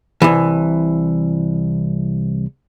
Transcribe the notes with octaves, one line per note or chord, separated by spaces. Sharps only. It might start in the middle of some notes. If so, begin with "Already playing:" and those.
C2 E3